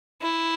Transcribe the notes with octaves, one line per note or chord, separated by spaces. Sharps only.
E4